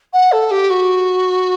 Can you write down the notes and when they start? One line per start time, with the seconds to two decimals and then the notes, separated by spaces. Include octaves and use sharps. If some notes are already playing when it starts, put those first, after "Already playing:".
0.13 F#5
0.32 A4
0.51 G4
0.70 F#4